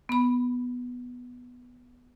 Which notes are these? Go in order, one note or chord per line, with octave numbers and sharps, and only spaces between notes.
B3 B5